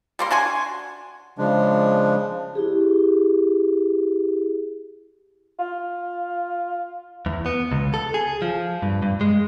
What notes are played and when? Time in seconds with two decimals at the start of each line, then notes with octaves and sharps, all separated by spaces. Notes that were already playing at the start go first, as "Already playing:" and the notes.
0.19 G3 A#3 C6
0.31 D4 F#4 G#5 C6
1.38 C#3 F3 G#3 D4
2.55 E4 G4 G#4
5.59 F4
7.26 E2
7.46 B3
7.72 C#2
7.94 A4
8.14 G#4
8.42 F3
8.82 G2
9.02 G2
9.21 G#3